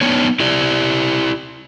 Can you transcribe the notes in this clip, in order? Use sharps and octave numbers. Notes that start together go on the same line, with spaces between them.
B3 D4 D#4 C#5
E4 G4 D5